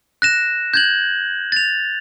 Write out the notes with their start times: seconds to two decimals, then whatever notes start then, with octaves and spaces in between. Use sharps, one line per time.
0.22 F#6 A#6 E7
0.74 G6 G#6 F#7
1.52 A6 F7